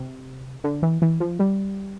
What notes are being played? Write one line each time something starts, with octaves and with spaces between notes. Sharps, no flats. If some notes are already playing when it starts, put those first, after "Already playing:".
Already playing: C3
D3
E3
E3
F3
G3